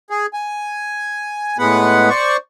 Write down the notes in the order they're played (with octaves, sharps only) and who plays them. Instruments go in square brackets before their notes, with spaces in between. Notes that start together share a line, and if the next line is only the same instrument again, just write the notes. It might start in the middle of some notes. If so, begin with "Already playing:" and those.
[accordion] G#4
G#5
A2 G#3 B3 B4 F#5
C5 D5 C#6